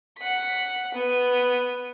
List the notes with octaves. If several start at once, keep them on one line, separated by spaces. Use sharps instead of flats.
F#5 B6
B3